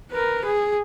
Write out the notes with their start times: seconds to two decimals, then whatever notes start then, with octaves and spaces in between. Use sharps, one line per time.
0.11 A#4 B4
0.45 G#4